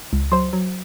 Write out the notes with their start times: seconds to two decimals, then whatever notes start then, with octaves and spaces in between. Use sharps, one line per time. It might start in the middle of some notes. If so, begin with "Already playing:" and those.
0.13 C#2
0.32 F#3 C5 C6
0.53 F#3